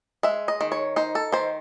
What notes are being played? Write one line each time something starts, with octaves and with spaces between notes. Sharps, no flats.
G#3 E5
D#5
D#3
C#5
D#4 C5
A4
D#3 C5